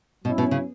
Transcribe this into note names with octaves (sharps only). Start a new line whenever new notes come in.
B2 F#3 C#4 E4
B2
C#3